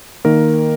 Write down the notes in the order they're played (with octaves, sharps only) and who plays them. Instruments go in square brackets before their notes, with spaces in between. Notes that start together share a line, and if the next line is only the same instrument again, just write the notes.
[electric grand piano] D#3 A#3 A#4